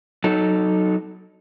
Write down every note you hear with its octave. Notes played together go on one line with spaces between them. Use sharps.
F#3 D#4 A4